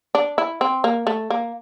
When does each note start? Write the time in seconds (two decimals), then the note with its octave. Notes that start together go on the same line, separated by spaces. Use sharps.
0.15 D4
0.38 E4
0.61 C4
0.84 A#3
1.07 A3
1.30 A#3